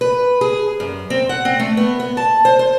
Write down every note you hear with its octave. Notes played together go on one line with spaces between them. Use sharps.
B4
G#4
F#2
C4
F#5
C4
A3
B3
B3
A5
C5
C5